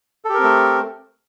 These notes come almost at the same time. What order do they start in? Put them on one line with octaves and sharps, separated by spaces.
A4 G4 A#4 C4 A3